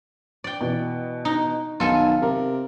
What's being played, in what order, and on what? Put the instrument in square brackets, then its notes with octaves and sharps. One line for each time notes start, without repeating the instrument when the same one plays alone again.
[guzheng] D5 G5
[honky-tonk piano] B2 E3
[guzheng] D#4
[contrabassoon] B1 [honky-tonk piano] D#3 [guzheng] F4 A4 G#5
[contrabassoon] C3 [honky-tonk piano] A#4